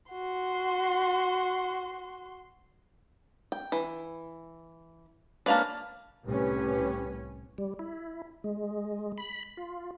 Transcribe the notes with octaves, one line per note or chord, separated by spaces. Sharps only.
F#4 C6
G5
E3
A#3 C#4 D4 B4 F5 A5
C2 A2 C#4 G4 B4
G3
E4
G#3
B5
F4